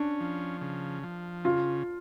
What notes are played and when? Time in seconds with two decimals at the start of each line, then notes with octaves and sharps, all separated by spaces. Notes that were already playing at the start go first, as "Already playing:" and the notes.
Already playing: C#4 D4
0.20 F3
0.61 C#3
1.03 F3
1.45 C#3 F4